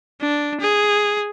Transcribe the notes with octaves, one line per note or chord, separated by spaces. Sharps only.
D4
G#4